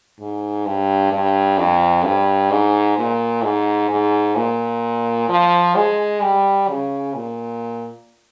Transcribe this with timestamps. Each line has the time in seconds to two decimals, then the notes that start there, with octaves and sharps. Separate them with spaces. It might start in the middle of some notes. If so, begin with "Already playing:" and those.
0.19 G#2
0.66 G2
1.12 G2
1.58 F2
2.04 G2
2.51 G#2
2.97 A#2
3.43 G#2
3.90 G#2
4.36 A#2
5.29 F3
5.75 G#3
6.22 G3
6.69 C#3
7.14 A#2